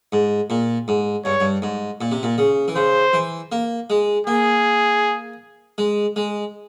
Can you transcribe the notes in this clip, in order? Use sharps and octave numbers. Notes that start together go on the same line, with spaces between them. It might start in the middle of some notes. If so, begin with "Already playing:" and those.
G#2
A#2
G#2
G2 C#5
G2
G#2
A#2
C3
A#2
C#3
E3
C#3 C5
E3
A#3
G#3
A#3 G#4
G#3
G#3